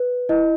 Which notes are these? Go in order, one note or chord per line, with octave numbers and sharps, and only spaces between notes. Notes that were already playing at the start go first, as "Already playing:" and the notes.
Already playing: B4
E4 D#5